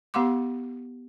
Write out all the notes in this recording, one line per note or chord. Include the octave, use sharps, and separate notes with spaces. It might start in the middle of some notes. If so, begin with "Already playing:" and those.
B3 G4 F5 F#5 C6 D6